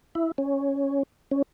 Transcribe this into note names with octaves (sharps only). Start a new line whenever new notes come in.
E4
C#4
C#4